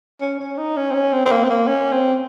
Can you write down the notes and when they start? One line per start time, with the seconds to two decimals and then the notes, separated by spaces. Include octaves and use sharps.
0.21 C#4
0.40 C#4
0.58 D#4
0.77 C#4
0.90 C4
0.94 C#4
1.13 C4
1.25 C4
1.32 A#3
1.44 C4
1.50 A#3
1.68 C#4
1.92 C4